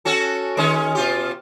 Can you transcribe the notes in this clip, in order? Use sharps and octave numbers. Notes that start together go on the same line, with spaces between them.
C#4 F#4 A4
D#3 G#3 C#4
B2 F4 G4